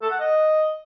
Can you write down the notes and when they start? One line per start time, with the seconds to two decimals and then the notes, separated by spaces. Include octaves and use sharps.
0.02 A4
0.11 F#5
0.19 D#5